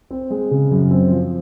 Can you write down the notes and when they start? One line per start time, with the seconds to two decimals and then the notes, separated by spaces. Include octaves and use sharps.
0.11 C4
0.30 G#3
0.51 C#3
0.71 F#2
0.91 C4
1.10 F3